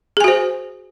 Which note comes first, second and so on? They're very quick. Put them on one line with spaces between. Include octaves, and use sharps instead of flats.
G#4 G#5 F#4 C5